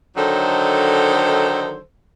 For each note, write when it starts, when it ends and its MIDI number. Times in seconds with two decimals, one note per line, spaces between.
0.17 1.80 50
0.17 1.80 51
0.17 1.80 54
0.17 1.80 63
0.17 1.80 69
0.17 1.80 72